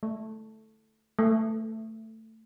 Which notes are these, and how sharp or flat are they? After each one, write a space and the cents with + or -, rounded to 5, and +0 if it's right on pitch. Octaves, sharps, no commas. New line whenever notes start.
A3 -5
A3 +15